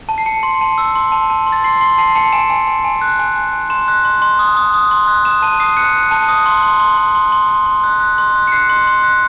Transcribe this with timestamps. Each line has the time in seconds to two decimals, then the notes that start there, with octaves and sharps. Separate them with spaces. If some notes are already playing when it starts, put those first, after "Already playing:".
0.09 A5
0.18 C7
0.26 A5 C#7
0.43 C6
0.61 A5
0.78 E6
0.96 C6
1.12 A5
1.30 A5
1.47 C6
1.52 A6
1.64 C6 C7
1.81 C6 C7
1.98 A5 C7
2.15 A5 C#7
2.33 G#5 E7
2.50 G#5
2.67 G#5
2.85 G#5
3.02 F#6
3.19 G#5
3.36 G#5
3.53 G#5
3.70 C6 E7
3.88 F#6
4.05 C6
4.22 C6
4.39 D#6
4.57 D#6
4.74 D#6
4.91 C6
5.08 F#6
5.25 D#6 E7
5.42 A5 D#7
5.60 D#6 C7
5.77 F#6 C#7
5.94 F#6
6.11 A5
6.28 D#6
6.46 C6
6.63 C6
6.80 C6
6.97 C6
7.15 C6
7.32 C6
7.49 C6
7.66 C6
7.84 F#6
8.00 F#6
8.18 C6
8.36 F#6
8.47 C#7
8.52 F#6 C7
8.69 C6
8.87 C6
9.03 F#6